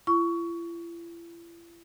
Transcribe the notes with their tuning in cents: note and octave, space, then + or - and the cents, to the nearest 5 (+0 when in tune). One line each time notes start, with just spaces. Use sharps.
E4 +45 C#6 +20